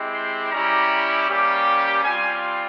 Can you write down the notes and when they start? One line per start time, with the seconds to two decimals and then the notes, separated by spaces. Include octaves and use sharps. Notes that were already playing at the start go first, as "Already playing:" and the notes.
Already playing: G#3 C4 E4 G4
0.13 C6
0.51 G3 C#4 E4 G4 A#5
1.28 G3 A#3 C#4 G4
1.66 G5
2.04 G3 C4 F4 G#5